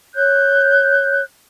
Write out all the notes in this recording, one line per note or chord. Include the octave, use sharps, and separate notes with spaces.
C#5 F#6 G6